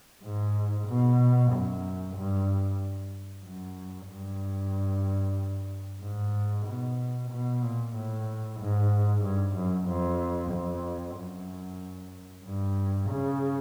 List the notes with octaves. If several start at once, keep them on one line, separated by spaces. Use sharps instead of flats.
G#2
B2
F#2
G2
F#2
G2
G#2
B2
B2
A#2
A2
G#2
G2
F#2
F2
F2
F#2
G2
C#3